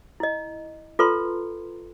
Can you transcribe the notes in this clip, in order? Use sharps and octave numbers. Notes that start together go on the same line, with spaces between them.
E4 D#5
F4 A4 B4 A#5 C6